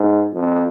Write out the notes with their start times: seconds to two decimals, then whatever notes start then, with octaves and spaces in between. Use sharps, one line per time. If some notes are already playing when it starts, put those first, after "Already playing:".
Already playing: G#2
0.33 F2